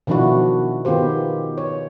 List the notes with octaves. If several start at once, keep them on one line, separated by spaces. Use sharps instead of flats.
B2 D#3 F3 D4 E4 F#4
D#3 B3 F4 G4 C5
C#5